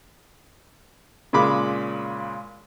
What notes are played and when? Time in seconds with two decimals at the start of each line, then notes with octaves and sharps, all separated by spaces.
1.33 A#2 C#3 G#3 B5 D6